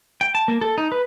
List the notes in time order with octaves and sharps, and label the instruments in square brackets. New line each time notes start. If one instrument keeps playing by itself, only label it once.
[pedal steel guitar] G5
A5
A#3
A4
D#4
B4